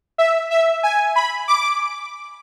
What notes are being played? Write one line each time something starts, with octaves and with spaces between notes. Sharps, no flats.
E5
E5
G#5
B5
D6